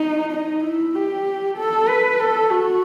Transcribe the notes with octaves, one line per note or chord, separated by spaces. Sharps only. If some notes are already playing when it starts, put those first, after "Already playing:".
Already playing: D#4
D#4
E4
G4
A4
B4
A4
F#4